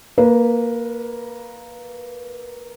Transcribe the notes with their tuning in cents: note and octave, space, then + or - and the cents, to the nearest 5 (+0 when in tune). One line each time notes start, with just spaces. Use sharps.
A#3 +0 B4 -20